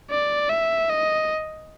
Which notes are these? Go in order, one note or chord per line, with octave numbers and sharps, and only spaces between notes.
D5
E5
D#5